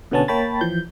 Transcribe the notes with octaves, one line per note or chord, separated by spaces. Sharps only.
B2 D3 B3 C#4 A5
A#3 C#5 G5 A5 B5 A6
E3 F3 G6